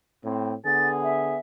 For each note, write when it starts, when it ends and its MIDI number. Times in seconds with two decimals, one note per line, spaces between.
0.25 0.54 45
0.25 0.54 60
0.65 1.37 50
0.65 1.37 59
0.65 1.37 68
0.65 0.88 93
1.03 1.40 76